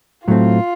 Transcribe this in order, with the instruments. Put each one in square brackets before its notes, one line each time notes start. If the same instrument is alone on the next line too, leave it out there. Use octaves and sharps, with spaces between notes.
[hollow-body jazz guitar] A2 F#3 A3 C4 [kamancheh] F4